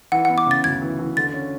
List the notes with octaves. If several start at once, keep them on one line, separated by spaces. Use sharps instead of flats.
E3 F#5
B3 F#5
D6
C#3 A6
D2 G#6
E3
E3
D3 A6
C#4